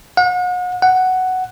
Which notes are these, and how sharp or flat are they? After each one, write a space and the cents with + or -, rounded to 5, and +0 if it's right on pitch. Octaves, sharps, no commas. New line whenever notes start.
F#5 -40
F#5 +5